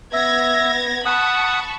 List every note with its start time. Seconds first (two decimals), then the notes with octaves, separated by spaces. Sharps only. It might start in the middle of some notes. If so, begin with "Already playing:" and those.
0.13 B3 E5 G#6 A#6
1.06 F#5 A5 B5 C#6 D#6